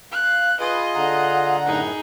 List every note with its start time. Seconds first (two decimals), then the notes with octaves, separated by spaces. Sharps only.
0.12 F5 F#6
0.60 F4 G#4 B4 D#5
0.95 D3 F#5 A#5
1.66 F#2 A2 D#4 G#4